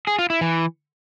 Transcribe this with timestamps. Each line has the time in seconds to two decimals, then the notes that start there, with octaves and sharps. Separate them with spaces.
0.07 G#4
0.19 F4
0.30 E4
0.41 E3